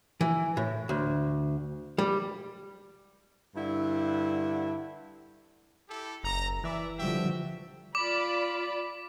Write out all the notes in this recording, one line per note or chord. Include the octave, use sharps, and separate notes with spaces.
E3
A2
D2
G3
G2 D3 E4
E4 G4 A4
F#1 A#5
E3 D5 E5
D3 F3 G3 F#4 E5 G5
F4 D5 B5 D6